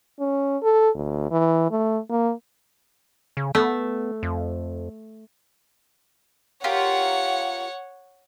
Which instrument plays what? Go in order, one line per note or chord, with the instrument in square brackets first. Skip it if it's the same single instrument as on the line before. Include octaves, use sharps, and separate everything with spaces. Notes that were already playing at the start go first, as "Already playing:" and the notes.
[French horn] C#4
A4
D2
E3
A3
A#3
[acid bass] C#3
[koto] A3 [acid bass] B3
[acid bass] F2
[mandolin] F4 G4 A#4 [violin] C#5 F#5